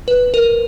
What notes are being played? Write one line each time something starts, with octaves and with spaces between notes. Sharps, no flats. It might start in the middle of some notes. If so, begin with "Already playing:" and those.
B4
A#4